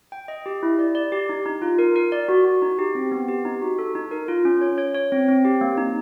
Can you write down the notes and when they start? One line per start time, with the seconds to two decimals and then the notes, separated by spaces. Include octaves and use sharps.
0.12 G5
0.28 D#5
0.46 G4
0.63 E4
0.79 D5
0.95 D5
1.12 G4
1.29 D#4
1.46 D#4
1.62 F4
1.79 A#4
1.96 A#4
2.12 D5
2.29 F#4
2.45 F#4
2.62 D#4
2.79 G4
2.95 C4
3.11 B3
3.28 G4
3.45 D#4
3.62 F#4
3.79 A4
3.95 D#4
4.11 A#4
4.28 F4
4.45 C#4
4.61 C#5
4.78 C#5
4.95 C#5
5.12 C4
5.28 C4
5.45 G4
5.61 A#3
5.78 D#4